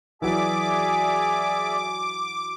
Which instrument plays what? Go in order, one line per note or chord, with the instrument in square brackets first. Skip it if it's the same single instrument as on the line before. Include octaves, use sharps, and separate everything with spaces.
[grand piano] E3 F#3 [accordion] G#4 D5 E5 [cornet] G#5 [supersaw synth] D6